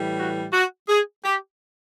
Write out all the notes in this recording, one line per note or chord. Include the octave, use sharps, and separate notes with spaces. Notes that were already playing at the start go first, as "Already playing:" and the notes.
Already playing: A2 E3 G3
F#4
F#4
G#4
G4